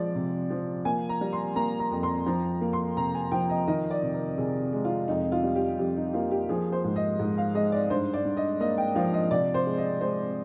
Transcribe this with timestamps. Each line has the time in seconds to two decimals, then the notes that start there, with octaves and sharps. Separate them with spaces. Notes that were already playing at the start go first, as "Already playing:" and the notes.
Already playing: F3 G#3 D5
0.15 C3
0.51 F3
0.85 A#3 G#5
1.09 A#5
1.21 G3
1.33 C6
1.56 A#3 A#5
1.80 A#5
1.91 F2
2.03 C6
2.26 F3 A#5
2.61 A#3
2.73 C6
2.97 C3 A#5
3.15 G#5
3.32 F3 G5
3.49 D#5
3.67 D#3 D#5
3.91 D5
4.02 C3
4.14 A#4
4.38 C3 G#4
4.73 G#3
4.85 F4
5.08 F2 D#4
5.32 F4
5.43 G3
5.55 G4
5.79 F2 G4
5.97 D#4
6.14 A#3 F4
6.31 G4
6.49 F3 G#4
6.72 C5
6.84 G#2
6.96 D#5
7.20 G#2
7.38 F5
7.55 G#3 D#5
7.72 D5
7.90 G2 C5
8.13 D5
8.25 G2
8.37 D#5
8.60 A#3 D#5
8.78 G5
8.95 F3 F5
9.14 D#5
9.31 C3 D5
9.54 C5
9.66 G#3
9.78 D#5
10.01 G#3 C5